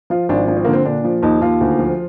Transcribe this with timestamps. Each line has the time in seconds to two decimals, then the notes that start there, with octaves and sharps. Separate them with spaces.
0.10 F3 F4
0.29 G#1 D4
0.48 F3 D4
0.57 C4
0.65 D3 A#3
0.73 C4
0.85 A#2 D4
1.04 F3
1.23 D#2 D#4
1.41 D#2 F4
1.61 D2
1.79 F3